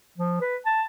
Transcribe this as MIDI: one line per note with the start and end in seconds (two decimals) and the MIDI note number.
0.18 0.39 53
0.41 0.57 71
0.66 0.83 81